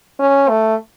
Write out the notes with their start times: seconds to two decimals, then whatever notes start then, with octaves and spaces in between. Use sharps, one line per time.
0.20 C#4
0.49 A3